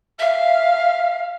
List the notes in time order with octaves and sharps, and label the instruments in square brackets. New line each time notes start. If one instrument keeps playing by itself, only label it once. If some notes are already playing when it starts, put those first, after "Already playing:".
[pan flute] E5 [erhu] F5